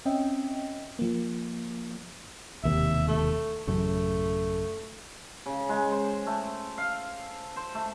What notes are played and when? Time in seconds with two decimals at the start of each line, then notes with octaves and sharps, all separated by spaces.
0.05 C4 C#4 D#5 E5 G5
0.99 F3 A#3
2.63 E1 D#2 C3 E5
3.08 A3
3.67 A1 F#2 C#3 A3
5.46 C#3
5.69 G#3
5.91 C5
6.26 A3
6.78 F5
7.56 C5
7.75 A3